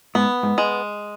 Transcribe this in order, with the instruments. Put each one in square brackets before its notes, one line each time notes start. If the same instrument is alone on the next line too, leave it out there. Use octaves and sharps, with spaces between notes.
[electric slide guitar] G#2 [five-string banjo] B3
[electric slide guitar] G#2
[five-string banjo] G#3